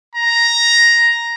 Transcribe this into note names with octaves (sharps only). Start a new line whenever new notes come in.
A#5